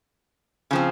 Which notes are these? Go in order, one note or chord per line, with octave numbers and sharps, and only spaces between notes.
C#3 F3 C4